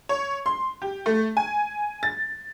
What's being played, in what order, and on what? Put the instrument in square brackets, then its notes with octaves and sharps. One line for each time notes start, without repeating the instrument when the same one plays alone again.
[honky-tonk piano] C#5
C6
G4
A3
G#5
A6